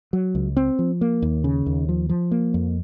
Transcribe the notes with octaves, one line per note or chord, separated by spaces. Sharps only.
F#3
C#2
C4
F3
A#3
D#2
C#3
D#2
F3
F3
A#3
F2